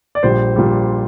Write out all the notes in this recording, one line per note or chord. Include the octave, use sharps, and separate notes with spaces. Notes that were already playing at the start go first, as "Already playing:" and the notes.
D5
A#1 A#2 G3 C5
A#1 A#2 G3